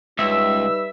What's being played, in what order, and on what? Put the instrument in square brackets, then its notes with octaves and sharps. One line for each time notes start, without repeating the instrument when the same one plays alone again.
[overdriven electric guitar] C#2 [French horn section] G3 D#4 B4 [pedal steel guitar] E5 [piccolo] E6